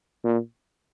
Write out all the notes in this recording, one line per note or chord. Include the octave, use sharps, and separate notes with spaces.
A#2